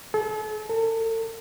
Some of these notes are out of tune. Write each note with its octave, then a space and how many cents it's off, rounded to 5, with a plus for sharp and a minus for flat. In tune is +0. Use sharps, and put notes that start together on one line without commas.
A4 -45
A4 +40